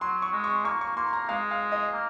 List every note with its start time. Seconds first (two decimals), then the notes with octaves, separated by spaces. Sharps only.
0.01 F#3 C6
0.22 C#6
0.33 G#3
0.44 C#6
0.65 A#3 C#6
0.81 C#6
0.97 A#3 C6
1.13 A#5
1.29 G#3 F5
1.51 F5
1.72 D#5
1.93 A#3